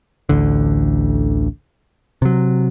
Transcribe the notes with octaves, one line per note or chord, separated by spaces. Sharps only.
A1 D2 D3
C3 F#3